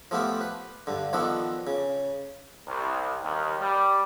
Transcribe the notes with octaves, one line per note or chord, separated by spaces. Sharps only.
F3 A3 B3 F4 G4
B4
G2 D3
D#3 F3 B3 D4 A4
C#3
C2
D#2
G3